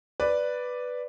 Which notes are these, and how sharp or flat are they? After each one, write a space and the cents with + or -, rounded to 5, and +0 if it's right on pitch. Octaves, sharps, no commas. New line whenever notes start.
B4 +0 D5 +0